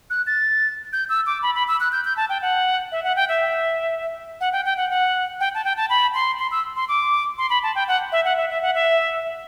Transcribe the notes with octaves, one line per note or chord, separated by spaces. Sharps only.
F#6
A6
G6
E6
D6
B5
B5
E6
F#6
G6
G6
A5
G5
F#5
E5
F#5
G5
E5
F#5
G5
G5
F#5
F#5
G5
A5
G5
A5
B5
C6
C6
E6
C6
D6
C6
B5
A5
G5
F#5
E5
F#5
E5
E5
F#5
E5